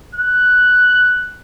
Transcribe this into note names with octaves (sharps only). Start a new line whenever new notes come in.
F#6